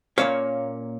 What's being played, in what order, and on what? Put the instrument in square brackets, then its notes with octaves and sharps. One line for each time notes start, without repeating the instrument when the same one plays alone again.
[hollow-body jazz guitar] A#2 F3 A#3 C#4 C#5 F5